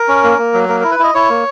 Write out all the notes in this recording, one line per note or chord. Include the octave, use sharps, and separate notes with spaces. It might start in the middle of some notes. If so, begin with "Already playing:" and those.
Already playing: A#4
C#4
A#3
A#3
F#3
A#3 A#4
E4 A#4
B4
E4 D#5
E4 C#5
A#3